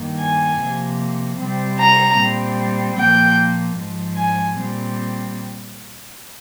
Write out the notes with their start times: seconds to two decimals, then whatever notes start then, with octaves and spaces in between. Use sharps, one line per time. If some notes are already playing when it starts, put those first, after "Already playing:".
Already playing: G2 D#3 A#3
0.19 G#5
0.60 C3 F3 A#3
1.38 C3 G3 C4
1.79 A#5
2.18 A#2 G3 C4
2.97 A#2 F3 A#3 G5
3.76 G#2 F3 G#3
4.16 G#5
4.56 A#2 G3 C4